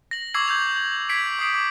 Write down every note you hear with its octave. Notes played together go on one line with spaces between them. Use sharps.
A#6 F#7
C#6 D6 E6 G#6 C7 F#7
G6 G#6 F7
G#6 B6 C7 D7
D6 D#6 C7 D7
D6